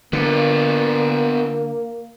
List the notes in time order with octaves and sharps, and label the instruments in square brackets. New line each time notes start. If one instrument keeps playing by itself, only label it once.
[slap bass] D3 [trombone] A#3 [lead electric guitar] B3 F4